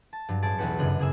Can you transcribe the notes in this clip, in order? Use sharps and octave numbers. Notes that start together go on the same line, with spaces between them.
A5
G2 F#3
A1 G#4 A5 D7
B1 E2 F#4 G4 B4 C#7
G1 F#2 C#3 F#6
C#3 G#4 G#5 E6